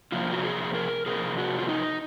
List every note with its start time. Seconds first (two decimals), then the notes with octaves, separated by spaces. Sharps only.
0.12 C3 F3 A#3 F4
0.33 F#4
0.43 G#4
0.74 A#4
1.06 C3 F3 A#3 G#4
1.38 F#4
1.59 F4
1.69 D#4